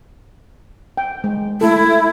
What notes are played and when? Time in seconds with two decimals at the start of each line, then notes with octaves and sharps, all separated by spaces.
0.97 G5
1.24 G#3
1.61 A3 E4 A4